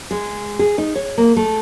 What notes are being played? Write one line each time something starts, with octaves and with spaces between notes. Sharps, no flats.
G#3
G#4
D#4
C#5
A#3
A3